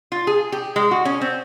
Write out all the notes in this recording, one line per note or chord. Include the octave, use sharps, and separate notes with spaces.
F4
G#4
G4
G#3
F#4
C#4
C4